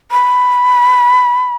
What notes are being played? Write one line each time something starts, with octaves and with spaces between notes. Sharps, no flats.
B5